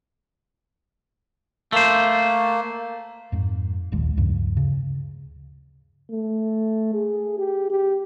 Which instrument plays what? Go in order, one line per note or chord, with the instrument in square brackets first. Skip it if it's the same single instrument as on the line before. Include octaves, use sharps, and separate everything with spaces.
[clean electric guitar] A3 C5 [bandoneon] A#3
[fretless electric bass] F2 G#2
D1 A#1 D#2 G#3
D2 G2 C#3 F3
C#3
[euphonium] A3
G#4
G4
G4